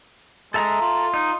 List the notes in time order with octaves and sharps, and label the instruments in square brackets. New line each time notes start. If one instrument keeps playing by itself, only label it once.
[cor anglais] G#3 [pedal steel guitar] A4 E5 A#5
[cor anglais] F4
[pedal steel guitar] D#4